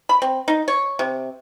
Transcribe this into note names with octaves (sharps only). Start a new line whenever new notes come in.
B5
C4
D#4
C#5
C3